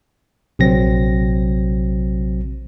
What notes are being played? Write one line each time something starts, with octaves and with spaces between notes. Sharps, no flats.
A#1 C3 F#3 C4 A#6